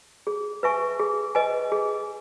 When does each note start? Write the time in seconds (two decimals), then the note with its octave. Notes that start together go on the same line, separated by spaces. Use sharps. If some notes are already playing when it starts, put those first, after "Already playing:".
0.27 G#4
0.63 B4 E5 G#5 C#6
0.99 G#4
1.35 B4 D#5 G#5
1.72 G#4